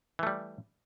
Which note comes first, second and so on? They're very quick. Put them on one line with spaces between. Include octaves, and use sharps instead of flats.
E3 A3 G3